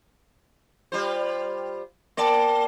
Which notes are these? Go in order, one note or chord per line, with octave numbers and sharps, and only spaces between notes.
G3 F4 C5
A#3 A#4 D5 G5 A5